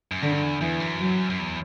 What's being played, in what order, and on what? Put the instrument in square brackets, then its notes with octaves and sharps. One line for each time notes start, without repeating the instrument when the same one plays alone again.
[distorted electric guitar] F#2
[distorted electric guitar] G2 [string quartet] D3
[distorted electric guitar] E2
[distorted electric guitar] E2 [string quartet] E3
[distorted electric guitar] F#2
[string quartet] F#3
[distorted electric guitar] F#2
E2